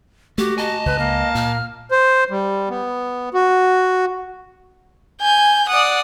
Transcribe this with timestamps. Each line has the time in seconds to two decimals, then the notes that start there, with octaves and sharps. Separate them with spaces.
0.38 A3 F#4 G4
0.58 D#5 G#5 A5
0.86 C#2 B4
0.99 A#3
1.35 A#2 F6
1.91 C5
2.30 G3
2.69 B3
3.34 F#4
5.21 G#5 G6
5.69 D5 F#5 D#6